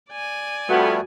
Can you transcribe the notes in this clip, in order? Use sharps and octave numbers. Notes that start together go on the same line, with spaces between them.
D5 G#5
F2 G3 A3 B3 F#4